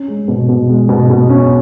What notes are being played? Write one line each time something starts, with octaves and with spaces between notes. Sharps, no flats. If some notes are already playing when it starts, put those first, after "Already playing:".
Already playing: C#4
G#3
B2
B2
G#3
B2
B2
C#4